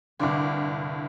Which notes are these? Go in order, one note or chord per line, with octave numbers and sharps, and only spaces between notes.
C2 G2 D3 D5